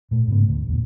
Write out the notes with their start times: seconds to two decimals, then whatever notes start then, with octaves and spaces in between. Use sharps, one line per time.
0.11 A#2 A3
0.28 G#2 C#3 B3
0.49 D2
0.67 A1 E2 A#2